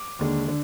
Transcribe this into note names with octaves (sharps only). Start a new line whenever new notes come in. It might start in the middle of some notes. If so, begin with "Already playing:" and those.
Already playing: D6
D#2 D3 G#3 D4
D3 D4